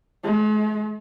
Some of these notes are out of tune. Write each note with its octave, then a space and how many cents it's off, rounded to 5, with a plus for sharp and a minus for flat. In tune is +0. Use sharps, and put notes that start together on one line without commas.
G#3 +45